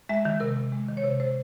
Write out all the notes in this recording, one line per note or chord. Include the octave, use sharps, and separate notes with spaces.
G#3 E5
D#3 E5
C3 A#4
C3
G#3
D#3
C#5
C3 C5
C3 C5